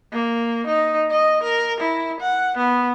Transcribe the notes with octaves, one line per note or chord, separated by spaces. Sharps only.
A#3
D#4
D#5
A#4
E4
F#5
B3